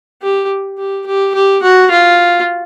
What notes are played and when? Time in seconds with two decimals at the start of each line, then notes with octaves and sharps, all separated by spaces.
0.22 G4
0.78 G4
1.06 G4
1.34 G4
1.62 F#4
1.91 F4